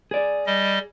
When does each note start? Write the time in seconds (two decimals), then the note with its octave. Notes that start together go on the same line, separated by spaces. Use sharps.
0.11 G#4 D5
0.47 G3 D#5